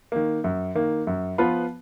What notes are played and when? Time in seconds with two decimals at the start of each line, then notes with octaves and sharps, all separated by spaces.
0.12 D#3 A#3
0.44 F#2
0.75 D#3 A#3
1.07 F#2
1.38 F3 B3 F4 B4